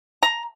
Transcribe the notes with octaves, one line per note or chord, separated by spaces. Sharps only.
A#5